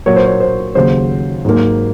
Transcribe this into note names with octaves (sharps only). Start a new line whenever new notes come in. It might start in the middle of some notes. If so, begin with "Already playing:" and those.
A#2 F#3 A#3 C#5
C5
C#5
C5
D#2 C#3 F#3 C5
G#2 F#3 A#3